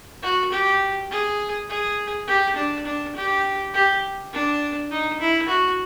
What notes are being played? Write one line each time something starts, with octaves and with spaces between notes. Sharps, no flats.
F#4
G4
G#4
G#4
G4
D4
D4
G4
G4
D4
D#4
E4
F#4